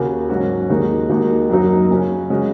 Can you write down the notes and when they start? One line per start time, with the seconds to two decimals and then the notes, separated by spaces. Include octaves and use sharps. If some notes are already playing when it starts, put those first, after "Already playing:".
Already playing: D#2 C#3 A#3 F#4
0.30 G#2 F#3 C#4 F#4
0.69 D#2 D#3 G#3 D#4 F#4
1.09 D#2 D#3 G#3 D#4 F#4
1.49 F#2 F#3 A#3 D#4 F#4
1.90 C#3 F#3 C#4
2.30 C#3 G#3 C#4 F#4